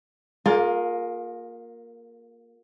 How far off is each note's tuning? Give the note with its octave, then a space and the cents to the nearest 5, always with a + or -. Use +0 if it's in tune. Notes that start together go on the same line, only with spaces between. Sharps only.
A#3 +0 F4 +30 G#4 +35